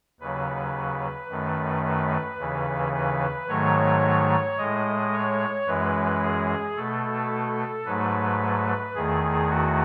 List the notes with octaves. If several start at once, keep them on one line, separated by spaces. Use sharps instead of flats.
D#2 C#3 F#3 B4
F#2 D#3 A3
B4
D#2 C#3 E3
B4
G#2 D#3 F#3 A3 C#5
A2 G#3 D#5
C#5
F#2 E3 G#3 B4
G#4
B2 A3 A4
G#2 F#3 A3 B4
E2 D#3 A3 G#4
F#4